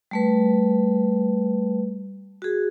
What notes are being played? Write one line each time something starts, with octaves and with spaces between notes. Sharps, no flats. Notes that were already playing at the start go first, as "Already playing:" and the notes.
G3 A3 B4
F#4 G#4